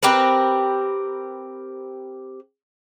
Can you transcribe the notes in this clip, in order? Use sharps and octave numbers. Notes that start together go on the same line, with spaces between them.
C4 G4 A#4 B4